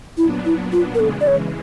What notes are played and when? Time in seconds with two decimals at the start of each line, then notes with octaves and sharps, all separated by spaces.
0.17 A#2 F#3 B3 D4 E4
0.45 E4
0.72 F4
0.95 A#4
0.99 C#3 E3 G#3 A4
1.21 D5
1.27 C#5